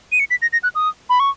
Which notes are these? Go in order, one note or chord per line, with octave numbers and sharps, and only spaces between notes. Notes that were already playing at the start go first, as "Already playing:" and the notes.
D#7
C#7
B6
A#6
A#6
F#6
D#6
B5
C#6